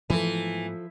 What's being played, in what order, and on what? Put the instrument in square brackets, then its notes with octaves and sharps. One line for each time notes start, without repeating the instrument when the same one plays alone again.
[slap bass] G#2 A3 B3 [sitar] E3 [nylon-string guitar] F3 A4